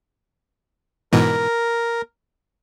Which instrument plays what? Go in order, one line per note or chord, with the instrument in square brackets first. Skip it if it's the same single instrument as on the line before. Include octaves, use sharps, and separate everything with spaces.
[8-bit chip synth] G#2 B2 E3 [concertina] A#4